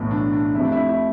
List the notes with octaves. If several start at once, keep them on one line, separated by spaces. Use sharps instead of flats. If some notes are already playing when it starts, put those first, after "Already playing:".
Already playing: B1 A2 E3 A3
D4
D4
F2 C3 F3 A3 E4
D4
E4
E4